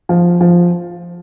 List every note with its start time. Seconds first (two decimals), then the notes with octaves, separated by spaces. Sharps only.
0.09 F3
0.41 F3